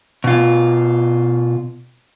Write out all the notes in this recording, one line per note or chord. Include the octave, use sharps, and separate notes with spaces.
B2 F4